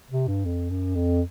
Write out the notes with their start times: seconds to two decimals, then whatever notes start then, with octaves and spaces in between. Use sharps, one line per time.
0.11 C3
0.28 G2
0.45 F2
0.70 F#2
0.95 F2